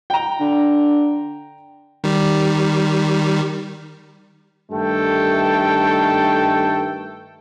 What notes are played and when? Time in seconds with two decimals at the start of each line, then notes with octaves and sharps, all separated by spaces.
0.10 G5 A#5
0.40 D3
2.04 D#3 G3
4.71 G2 D#3 A3 A4 G5